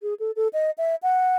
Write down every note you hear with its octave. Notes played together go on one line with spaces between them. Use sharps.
G#4
A4
A4
D#5
E5
F#5